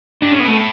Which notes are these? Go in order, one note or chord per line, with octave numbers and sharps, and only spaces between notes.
G2 D4
A2 C#4
B3
B2 A3
A2